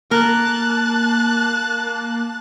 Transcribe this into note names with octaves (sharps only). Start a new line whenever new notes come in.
A#3 A#4 A5 F#6